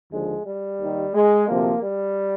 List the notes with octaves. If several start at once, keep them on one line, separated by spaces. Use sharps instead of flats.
D#2 D3 F3 G#3
G3
D#2 D#3
G#3
D2 C3 F3 A#3
G3